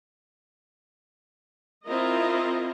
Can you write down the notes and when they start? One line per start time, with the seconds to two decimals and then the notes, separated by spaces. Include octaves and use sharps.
1.85 C4 E4 F4 A#4 D#5